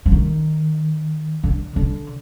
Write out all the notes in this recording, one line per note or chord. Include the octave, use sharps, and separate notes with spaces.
F3
D#3
D3
D3